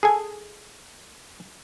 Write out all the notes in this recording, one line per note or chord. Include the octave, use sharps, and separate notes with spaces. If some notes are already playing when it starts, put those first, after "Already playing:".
G#4 A4 G#5